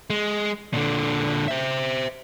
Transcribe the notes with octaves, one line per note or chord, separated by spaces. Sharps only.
G#3
A#2 D3
C5 E5